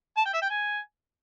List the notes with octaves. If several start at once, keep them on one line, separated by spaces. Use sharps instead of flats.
A5
G5
E5
G5
G#5